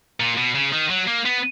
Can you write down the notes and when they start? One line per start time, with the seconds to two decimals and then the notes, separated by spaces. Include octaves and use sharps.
0.20 A#2
0.38 B2
0.55 C#3
0.73 D#3
0.90 F#3
1.07 A#3
1.26 B3